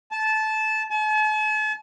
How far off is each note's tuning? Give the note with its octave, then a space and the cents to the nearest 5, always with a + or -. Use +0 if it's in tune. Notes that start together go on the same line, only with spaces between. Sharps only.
A5 -15
A5 -45